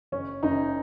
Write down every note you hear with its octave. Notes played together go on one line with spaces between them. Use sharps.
F#1 C#4
F#1 D#4